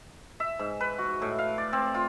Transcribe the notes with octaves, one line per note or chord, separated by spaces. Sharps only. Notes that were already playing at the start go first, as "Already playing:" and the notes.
E5
G#2
B4
F#4
A2
F5
D5
C4
F4